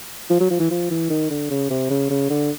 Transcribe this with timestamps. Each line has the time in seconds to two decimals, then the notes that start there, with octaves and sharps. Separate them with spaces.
0.30 F3
0.40 F#3
0.50 F3
0.60 E3
0.71 F3
0.90 E3
1.10 D#3
1.30 D3
1.50 C#3
1.70 C3
1.90 C#3
2.10 C#3
2.30 D3